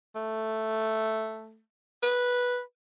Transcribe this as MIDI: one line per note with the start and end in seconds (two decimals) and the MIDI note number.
0.16 1.61 57
2.03 2.61 71